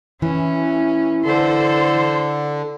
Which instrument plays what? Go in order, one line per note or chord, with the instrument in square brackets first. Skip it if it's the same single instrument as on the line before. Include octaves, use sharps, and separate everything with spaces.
[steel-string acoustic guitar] E3 [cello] C#4
[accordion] D3 [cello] A4 C5